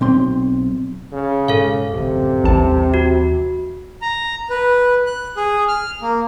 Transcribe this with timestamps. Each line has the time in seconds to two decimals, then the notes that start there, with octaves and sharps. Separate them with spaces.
0.01 B1 C4 C6
1.12 C#3
1.48 G#2 B2 A4 F5
1.93 D1 G#1 F#2 C3
2.44 A1 D#2 E3 G3 A5
2.94 F#4
4.02 A#5
4.50 B4
5.07 F#6
5.37 G#4
5.68 F6
6.02 A#3